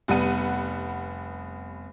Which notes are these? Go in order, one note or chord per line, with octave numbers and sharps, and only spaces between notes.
F1 G3 B3 F#5 D#7